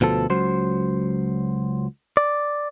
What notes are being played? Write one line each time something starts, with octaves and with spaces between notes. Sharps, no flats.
D2 B2 F3 A4
C#2 F#3 C5
D5